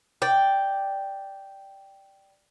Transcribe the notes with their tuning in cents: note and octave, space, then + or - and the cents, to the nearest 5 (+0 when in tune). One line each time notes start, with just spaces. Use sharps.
D5 +0 G5 +0